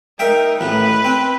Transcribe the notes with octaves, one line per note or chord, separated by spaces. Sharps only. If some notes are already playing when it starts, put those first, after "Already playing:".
D#4 A#4 E5 G5
A1 A2 B4
C4